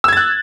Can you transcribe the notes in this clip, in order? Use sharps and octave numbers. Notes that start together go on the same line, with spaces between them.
E6 F#6 G#6 A6